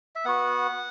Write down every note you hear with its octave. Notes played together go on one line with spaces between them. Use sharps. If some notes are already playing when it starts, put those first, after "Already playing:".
E5
B3 F#4 F#5